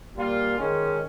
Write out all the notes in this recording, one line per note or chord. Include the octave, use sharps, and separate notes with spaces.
A#2 G3 A#3 F4
D#3 G#3 C#4